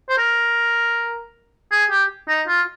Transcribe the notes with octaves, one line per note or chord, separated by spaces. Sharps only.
C5
A#4
G#4
G4
D#4
F4